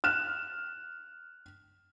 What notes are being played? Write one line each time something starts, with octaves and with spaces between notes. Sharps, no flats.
F6 F#6 E7